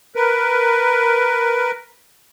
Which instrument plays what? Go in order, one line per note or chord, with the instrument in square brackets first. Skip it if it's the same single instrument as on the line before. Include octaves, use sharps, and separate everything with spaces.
[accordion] A#4 B4